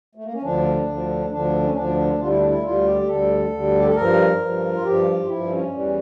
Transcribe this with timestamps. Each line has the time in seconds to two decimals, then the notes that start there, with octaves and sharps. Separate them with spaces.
0.15 A3
0.24 A#3
0.33 C#4
0.42 D2 D3 F3 D4
0.86 D2 D3 F3
1.30 D2 D3 F3 D4
1.63 C#4
1.74 D2 D3 F3 D4
2.18 D2 D3 G3 F4
2.28 E4
2.37 D4
2.48 E4
2.62 D2 D3 G3 F4
2.85 G4
3.07 D2 D3 G3 A4
3.51 D2 D3 G3
3.79 G4
3.87 A4
3.95 G2 F3 A#4
4.39 G2 F3
4.74 F4
4.83 G2 F3 G4
5.23 F4
5.27 G2 F3 E4
5.50 C#4
5.72 E2 E3 G3